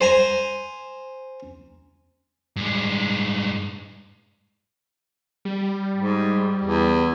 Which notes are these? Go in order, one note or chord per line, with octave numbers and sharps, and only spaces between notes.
C5 G#5 A#5
G2 G#3
G3
G#2
E2